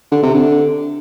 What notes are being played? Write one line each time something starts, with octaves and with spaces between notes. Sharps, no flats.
D3
C3
D3